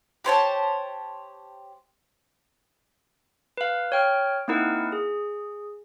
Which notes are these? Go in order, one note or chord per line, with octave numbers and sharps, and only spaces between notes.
G4 C5 C#5 A5
B4 F5
C#5 G5 F6
A#3 C4 D#4 E4 A#4 F#5
G#4